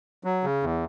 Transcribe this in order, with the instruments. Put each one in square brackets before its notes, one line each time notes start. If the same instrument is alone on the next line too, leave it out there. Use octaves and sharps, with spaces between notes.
[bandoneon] F#3
C#3
E2